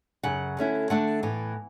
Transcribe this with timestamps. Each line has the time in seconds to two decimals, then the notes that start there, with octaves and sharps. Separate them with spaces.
0.23 F#2 C#3 F#5
0.57 D3 A3 C#4 E4
0.90 D3 A3 D4 F#5
1.23 A2 E3 B3